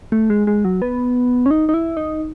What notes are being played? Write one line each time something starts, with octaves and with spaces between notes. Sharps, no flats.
A3
G#3
G#3
F#3
B3
C#4
D#4
D#4
E4
D#4